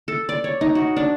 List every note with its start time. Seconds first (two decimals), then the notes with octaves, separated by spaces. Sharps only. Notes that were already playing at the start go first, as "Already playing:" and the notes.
0.08 A4
0.29 D5
0.44 C#5
0.61 D#4
0.75 F#4
0.96 D4